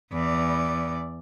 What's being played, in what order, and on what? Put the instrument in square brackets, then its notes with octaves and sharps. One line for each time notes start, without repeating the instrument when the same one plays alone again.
[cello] E2 D5